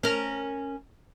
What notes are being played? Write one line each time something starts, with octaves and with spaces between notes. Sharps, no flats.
C#4 A#4